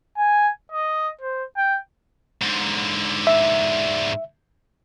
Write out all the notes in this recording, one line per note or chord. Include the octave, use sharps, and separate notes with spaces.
G#5
D#5
C5
G5
G#2 D3
E5